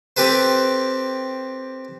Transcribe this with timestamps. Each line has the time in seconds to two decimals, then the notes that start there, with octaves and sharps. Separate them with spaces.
0.17 C4 G4 A4 B4 C5